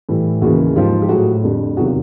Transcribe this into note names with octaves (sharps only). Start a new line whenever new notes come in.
A2 E3 G3
D#2 C#3 E3 F#4 G#4
G#2 F3 F4 G4
G4
A2 F#3 F#4 G#4
F2 D3 G3
E2 C3 D#3 F#3 F#4 G#4
F4 G4